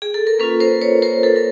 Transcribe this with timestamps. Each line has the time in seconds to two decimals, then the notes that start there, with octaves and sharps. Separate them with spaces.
0.02 G#4
0.14 A4
0.27 A#4
0.39 A#3 C#4 F4 A4 B4
0.60 A#4 C5
0.81 B4 C#5
1.02 A#4 C5
1.23 A4 B4
1.36 A#4